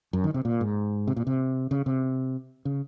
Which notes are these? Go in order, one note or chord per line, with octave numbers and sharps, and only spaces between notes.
F#2
D#3
C3
A#2
G#2
C3
A#2
C3
C#3
C3
C#3